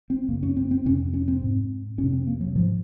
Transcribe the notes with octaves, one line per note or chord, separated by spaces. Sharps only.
C4
F#2 C#3 A#3
C#4
C4
C4
F2 C3 C#4
C#4
C4
G#2
F2 C3 C#4
C4
A#3
F#3
G#2 F3